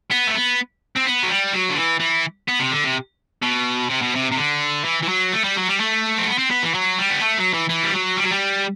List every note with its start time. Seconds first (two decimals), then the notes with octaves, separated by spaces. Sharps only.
0.11 B3
0.27 A3
0.34 B3
0.96 C4
1.05 B3
1.23 F#3
1.29 G3
1.53 F#3
1.70 D3
1.76 E3
2.00 E3
2.48 B3
2.60 C3
2.71 D3
2.84 C3
3.42 B2
3.89 C3
4.02 B2
4.16 C3
4.32 C3
4.37 D3
4.85 E3
5.03 E3
5.09 F#3
5.32 A3
5.44 G3
5.56 F#3
5.68 G3
5.80 A3
6.18 C4
6.27 B3
6.38 C4
6.51 B3
6.63 E3
6.74 F#3
6.99 G3
7.10 B3
7.21 A3
7.38 F#3
7.53 E3
7.69 E3
7.83 G3
7.93 F#3
8.17 G3
8.24 F#3
8.31 G3